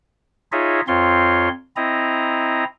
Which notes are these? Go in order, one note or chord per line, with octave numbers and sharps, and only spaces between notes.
D#4 F4 G#4 C#5 D#5 E5
F2 C4 F4 C#5 C6
C4 E4 D#5 A#5